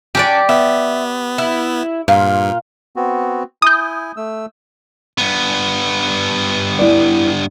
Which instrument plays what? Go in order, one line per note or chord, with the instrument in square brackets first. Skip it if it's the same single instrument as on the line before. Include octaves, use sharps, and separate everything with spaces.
[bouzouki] C#4 D4 [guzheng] G4 D5
[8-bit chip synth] B3 [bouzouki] E5
[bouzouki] E4
[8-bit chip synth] G2 [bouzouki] A#2 F4
[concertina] B3 C4 F#4
[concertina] E4 G#5 [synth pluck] D#6 G6
[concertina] A3 E6
[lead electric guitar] G2 B3
[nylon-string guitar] E4 D5